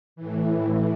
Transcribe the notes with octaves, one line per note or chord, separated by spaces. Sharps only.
A2 E3